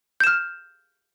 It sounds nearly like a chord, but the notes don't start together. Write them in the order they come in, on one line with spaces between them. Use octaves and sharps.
G6 E7 F6